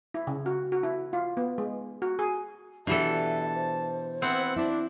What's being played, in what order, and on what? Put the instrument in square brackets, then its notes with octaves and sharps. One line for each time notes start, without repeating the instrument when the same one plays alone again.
[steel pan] E4
C#3
F#4
F#4
E4
F4
B3
G#3
F#4
G#4
[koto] B2 E3 A4 [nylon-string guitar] D4 G4 D5 [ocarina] E5 [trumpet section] A5
[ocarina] C5
[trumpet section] B3 E4 F#5 [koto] C4
[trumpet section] D4 [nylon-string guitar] E4